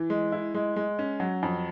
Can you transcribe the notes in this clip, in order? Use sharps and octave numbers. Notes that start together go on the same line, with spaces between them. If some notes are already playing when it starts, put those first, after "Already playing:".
Already playing: E3
G#3
E4
G#3
G#3
C#4
F#3
F2